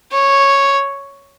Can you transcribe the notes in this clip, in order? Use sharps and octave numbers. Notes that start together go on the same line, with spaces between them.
C#5